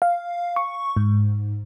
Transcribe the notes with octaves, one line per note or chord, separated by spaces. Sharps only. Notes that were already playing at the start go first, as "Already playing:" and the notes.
F5
C#6
G#2